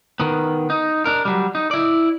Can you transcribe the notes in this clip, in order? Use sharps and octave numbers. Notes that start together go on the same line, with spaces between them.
D#3 B3
D#4
D4 A#4
F#3 G3
D#4
E4 D5